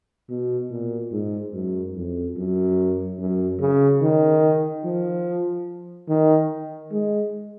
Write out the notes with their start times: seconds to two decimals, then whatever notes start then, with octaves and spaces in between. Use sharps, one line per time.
0.30 B2
0.71 A#2
1.12 G#2
1.53 F#2
1.96 F2
2.37 F#2
3.19 F#2
3.60 C#3
4.01 D#3
4.85 F3
6.08 D#3
6.92 G#3